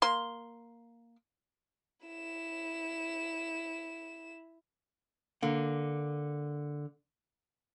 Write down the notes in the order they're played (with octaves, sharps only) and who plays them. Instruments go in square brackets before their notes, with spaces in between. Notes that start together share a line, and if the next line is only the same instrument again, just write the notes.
[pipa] A#3 C6
[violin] E4 E7
[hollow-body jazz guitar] D3 A#3